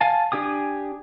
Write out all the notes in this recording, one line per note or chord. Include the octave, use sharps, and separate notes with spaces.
F5 G#5 A5
D4 G4 G#5 D#6